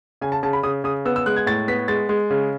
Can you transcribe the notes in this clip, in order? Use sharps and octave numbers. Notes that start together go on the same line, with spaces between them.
C#3 G#5
A5
C#3 A5
B5
C#3 D#6
C#3 D#6
B3 E6
E6
G#3 F#6
G#6
A2 A6
B3 B6
G#3 A6
G#3
C#3